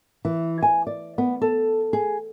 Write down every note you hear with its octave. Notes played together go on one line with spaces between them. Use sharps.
E3
G#5
D5
B3
A4
G#4